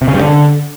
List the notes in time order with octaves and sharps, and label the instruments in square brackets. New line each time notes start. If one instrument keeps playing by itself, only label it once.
[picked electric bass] C3
C#3
G2
D3